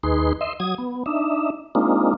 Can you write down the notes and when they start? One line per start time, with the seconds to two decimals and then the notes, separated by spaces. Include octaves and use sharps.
0.03 D#2 D#4 G#4 B4 C6
0.41 D#5 E5 C6
0.60 F#3 D#6 G#6
0.78 B3
1.06 D4 D#4 E5
1.75 G#3 A#3 C4 D4 D#4 F4